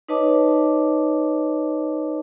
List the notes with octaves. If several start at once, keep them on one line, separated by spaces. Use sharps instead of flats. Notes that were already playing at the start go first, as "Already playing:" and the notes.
D#4 B4 C#5 D#5 A5 D6